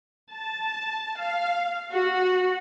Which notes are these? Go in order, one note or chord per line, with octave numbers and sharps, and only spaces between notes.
A5
F5
F#4